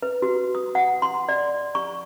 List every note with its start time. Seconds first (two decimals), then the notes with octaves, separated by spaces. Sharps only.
0.03 B4
0.22 F#4
0.55 D#6
0.75 F#5
1.02 C6
1.29 D5
1.75 C#6